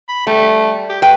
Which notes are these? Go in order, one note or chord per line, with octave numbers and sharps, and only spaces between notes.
B5
G3 A3
G4
A3 B4 G5